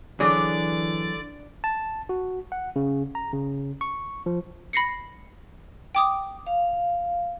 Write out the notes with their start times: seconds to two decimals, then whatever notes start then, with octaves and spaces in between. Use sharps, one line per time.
0.20 D3 E3 F#3 D4 G#4 D5
1.64 A5
2.09 F#4
2.52 F#5
2.76 C#3
3.15 A#5
3.33 C#3
3.81 C#6
4.26 F3
4.73 B5 A#6 C7 C#7
5.95 G5 D6 D#6
6.47 F5